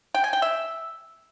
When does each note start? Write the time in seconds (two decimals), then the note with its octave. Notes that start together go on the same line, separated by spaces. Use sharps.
0.15 G5
0.24 G#5
0.33 G5
0.42 E5